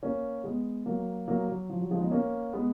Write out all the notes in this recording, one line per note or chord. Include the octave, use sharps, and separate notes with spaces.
A#3 C#4
G#3 B3
F#3 A#3
F#3 A#3
F#3
F3
F#3
F3 G#3
B3 D#4
A#3 C#4
G#3 B3